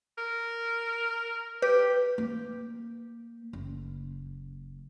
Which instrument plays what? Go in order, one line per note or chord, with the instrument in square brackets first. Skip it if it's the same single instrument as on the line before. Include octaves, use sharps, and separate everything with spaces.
[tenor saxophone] A#4
[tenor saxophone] G4 [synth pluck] B4
[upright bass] A#3
F#1